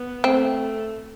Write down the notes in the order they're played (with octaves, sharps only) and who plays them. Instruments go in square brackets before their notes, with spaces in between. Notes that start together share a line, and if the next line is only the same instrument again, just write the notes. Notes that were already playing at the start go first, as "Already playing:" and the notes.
Already playing: [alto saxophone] B3
[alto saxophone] A3 [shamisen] C4